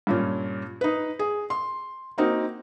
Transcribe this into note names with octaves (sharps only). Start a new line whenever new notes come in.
G2 A#2 C#4
D#4 B4
G#4
C6
A#3 C4 D#4 F#4